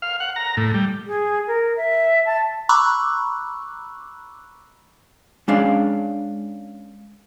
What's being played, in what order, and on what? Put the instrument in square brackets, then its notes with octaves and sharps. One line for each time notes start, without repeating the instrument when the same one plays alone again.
[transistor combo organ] F5
F#5
A#5
A2
G3
[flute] G#4
A#4
E5
A5
[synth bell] A#5 B5 C#6 D6 E6 F#6
[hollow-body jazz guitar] G#3 C#4 D4 D5 F5